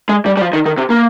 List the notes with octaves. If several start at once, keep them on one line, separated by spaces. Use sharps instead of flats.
G#3
G3
G3
F3
D#3
D#3
C3
A#3